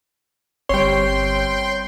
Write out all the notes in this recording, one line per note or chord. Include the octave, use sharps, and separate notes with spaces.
G1 G3 C4 C#5 G5 C6